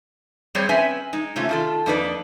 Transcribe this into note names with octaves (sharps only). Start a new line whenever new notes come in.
G3 C4 G#4 C5 C#5
C4 C#4 B4 E5 G#5
G#3 D#4
C3 A3 C#4 F4
D#3 F4 A4
F2 A#3 D4 D#4 B4 D5